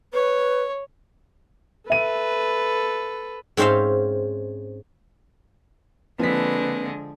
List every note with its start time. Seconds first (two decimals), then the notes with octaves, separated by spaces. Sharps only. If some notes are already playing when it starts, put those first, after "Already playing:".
0.13 B4 C#5
1.90 A4 B4 E5 D#7
3.57 G#2 C4 C#4 C5 E5 F5
6.19 D3 F3 G#3 A#3 C4 B4 B6